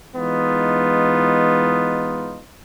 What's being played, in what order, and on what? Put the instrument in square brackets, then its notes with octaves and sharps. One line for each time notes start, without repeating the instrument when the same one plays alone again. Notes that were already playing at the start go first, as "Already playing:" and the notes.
[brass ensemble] E3 G#3 B3 D#4 F4